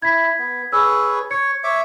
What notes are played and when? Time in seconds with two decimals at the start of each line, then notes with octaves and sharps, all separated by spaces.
0.02 E4 G#6 B6
0.39 B3
0.72 G#4 B4 C#5 E6
1.31 C#5 G#6 C#7
1.64 C#5 E5 D6